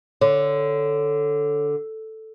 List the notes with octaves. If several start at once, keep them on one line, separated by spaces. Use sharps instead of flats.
D3 C#5